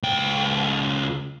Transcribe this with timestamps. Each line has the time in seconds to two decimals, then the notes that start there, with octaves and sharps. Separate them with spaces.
0.03 C#2 G5